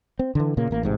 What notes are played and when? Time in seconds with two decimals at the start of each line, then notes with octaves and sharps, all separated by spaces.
0.19 C4
0.35 D3 E3
0.57 A#2 C#3 A#3
0.71 A1 A#3
0.83 A1 G#2 C3